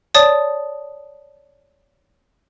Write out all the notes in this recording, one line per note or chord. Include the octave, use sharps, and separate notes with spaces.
C#5 D5 A5 D#6